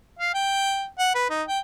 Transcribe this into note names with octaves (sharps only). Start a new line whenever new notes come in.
F5
G5
F#5
B4
D#4
G5